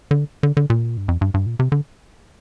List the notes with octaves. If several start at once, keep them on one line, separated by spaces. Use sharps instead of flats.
D3
D3
D3
A#2
G2
F2
G2
G2
A#2
C3
D3